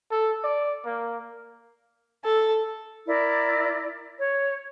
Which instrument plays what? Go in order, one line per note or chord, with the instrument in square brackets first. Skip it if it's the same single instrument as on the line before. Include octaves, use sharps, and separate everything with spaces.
[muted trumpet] A4
D5
A#3
[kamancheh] A4
[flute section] E4 A#4 D5
C#5